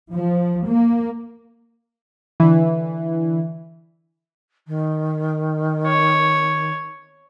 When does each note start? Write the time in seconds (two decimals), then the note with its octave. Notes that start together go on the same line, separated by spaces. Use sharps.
0.10 F3
0.64 A#3
2.40 D3 E3
4.67 D#3
5.87 C#5